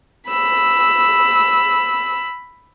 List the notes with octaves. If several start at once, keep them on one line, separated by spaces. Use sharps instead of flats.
B5 E6